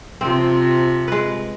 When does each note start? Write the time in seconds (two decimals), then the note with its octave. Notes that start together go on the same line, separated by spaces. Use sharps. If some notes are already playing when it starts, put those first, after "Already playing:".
0.21 C3 F3 C4
1.08 G#3 B4